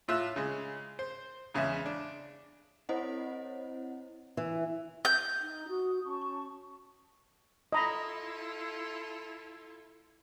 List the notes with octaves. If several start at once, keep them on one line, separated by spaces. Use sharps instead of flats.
A2 F4 E5 E6 F#6
C#3 G#3
C5
E2 C#3 G#3 E5
D4
C4 E4 C5 C#5 D#5 F#5
E3
G6
D#4
F#4 D#6
C#4 A5 C#6
E4 F4 A4 D#5 A#5 B5